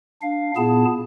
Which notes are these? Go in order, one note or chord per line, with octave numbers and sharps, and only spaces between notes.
D4 F5
A#2 B3 E4 G#4 A5